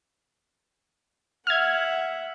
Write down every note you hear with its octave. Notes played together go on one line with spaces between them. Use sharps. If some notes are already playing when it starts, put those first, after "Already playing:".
E5 F#5 F6 G#6